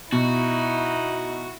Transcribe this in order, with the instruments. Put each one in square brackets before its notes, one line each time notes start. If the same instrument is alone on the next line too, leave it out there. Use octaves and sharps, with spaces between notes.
[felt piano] B2 [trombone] D#4 [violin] E4 [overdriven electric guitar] F#4